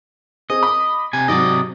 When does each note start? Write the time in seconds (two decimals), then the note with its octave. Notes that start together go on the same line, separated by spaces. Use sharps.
0.50 C4 G#4 D#5
0.63 B5 D6
1.13 C3 G#5
1.28 G#2 C3 F#3 D5 D#5